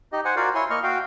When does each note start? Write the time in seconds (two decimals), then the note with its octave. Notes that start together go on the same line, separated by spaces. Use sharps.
0.13 D#4 G4 D#5
0.25 C5 F#5 G#5
0.36 F4 F#4 A#4 D5 F5
0.55 E4 C#5 G#5 C6
0.70 A#3 D#5 C#6 F6
0.83 F#4 F5 G5